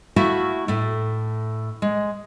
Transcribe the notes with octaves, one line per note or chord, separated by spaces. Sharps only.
A3 E4 F#4 E5 F5
A2 A3
G#3